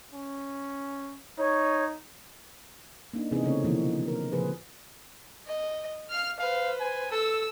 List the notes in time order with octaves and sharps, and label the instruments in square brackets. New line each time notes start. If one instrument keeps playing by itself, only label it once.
[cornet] C#4
[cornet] D#4 [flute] C#5
[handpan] A#3 D4 D#4
C3 E3 B3 D#4 G#4
C#3 A3 C4 C#4 C#5
B2 D3 E3 F3 A#3
A#4
A#2 C#3 F3 G#4 B4 C5
[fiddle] D#5
F5 F6
[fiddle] B4 C5 [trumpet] F5
[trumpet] G#5
[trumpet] A4 [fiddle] E6